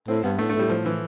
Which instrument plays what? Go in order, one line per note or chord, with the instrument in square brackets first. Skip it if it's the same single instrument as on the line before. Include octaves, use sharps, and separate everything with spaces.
[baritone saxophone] A2 [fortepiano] C4
[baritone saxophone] G2 [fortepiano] B3
[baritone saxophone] A2 [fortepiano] A3
[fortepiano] A3
[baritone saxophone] A2 [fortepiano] G3
[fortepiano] F3
E3